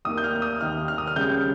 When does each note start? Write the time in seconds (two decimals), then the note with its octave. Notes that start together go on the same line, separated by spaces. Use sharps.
0.05 D#2 D#3 A#3 D#6
0.18 G6
0.24 F6
0.42 D#6
0.60 D#2 D#3 A#3 F6
0.88 F6
0.98 D#6
1.07 F6
1.16 C#2 C#3 G3 G6